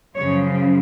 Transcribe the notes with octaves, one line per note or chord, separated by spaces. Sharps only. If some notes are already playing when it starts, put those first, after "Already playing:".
F#2 C#3 F3 C#5